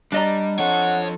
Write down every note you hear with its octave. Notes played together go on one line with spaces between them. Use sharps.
G3 D4 D#5 A#5
F3 A4 C#5 F#5